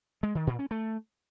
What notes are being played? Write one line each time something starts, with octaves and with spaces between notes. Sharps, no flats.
G#3
D#3
A#2
C#4
A3